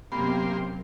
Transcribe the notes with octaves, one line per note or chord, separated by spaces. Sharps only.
F#2 C3 A#3 B3 G4 B5 C6